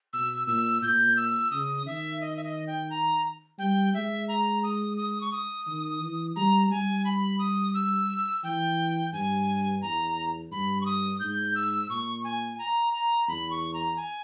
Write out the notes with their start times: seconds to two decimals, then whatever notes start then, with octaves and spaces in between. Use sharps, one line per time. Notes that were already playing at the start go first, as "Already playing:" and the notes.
0.13 B2 E6
0.47 A#2 E6
0.82 A#2 G6
1.17 E6
1.51 C#3 D#6
1.86 D#3 E5
2.21 D#5
2.37 E5
2.44 D#5
2.67 G5
2.90 A#5
3.59 G3 G5
3.93 G#3 E5
4.28 A#5
4.63 D#6
4.97 D#6
5.21 C#6
5.32 D#6
5.67 D#3
6.01 E3
6.36 G3 A#5
6.70 G3 G#5
7.05 B5
7.39 D#6
7.74 E6
8.43 E3 G5
9.13 G2 G#5
9.82 E2 A#5
10.51 G2 B5
10.81 C#6
10.85 D#6
11.20 G#2 G6
11.55 E6
11.90 A#2 C#6
12.24 G#5
12.59 A#5
12.93 A#5
13.28 E2 B5
13.51 C#6
13.74 A#5
13.97 G#5